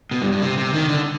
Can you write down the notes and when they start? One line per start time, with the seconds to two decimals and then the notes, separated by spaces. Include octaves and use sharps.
0.11 B2
0.22 G2
0.32 G2
0.42 C3
0.58 C3
0.73 D#3
0.89 D3